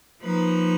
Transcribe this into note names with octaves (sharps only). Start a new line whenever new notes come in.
F3 A#3 D#4 B4